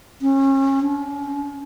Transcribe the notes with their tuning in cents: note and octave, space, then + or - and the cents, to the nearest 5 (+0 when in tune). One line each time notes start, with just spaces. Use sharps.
C#4 -30
C#4 +45